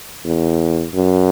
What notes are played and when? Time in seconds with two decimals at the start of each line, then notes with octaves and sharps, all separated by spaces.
0.24 E2
0.94 F#2